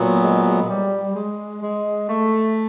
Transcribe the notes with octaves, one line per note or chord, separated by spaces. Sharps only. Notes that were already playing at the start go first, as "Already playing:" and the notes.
Already playing: A#2 F#3 B3
G#3
G3
G#3
G#3
A3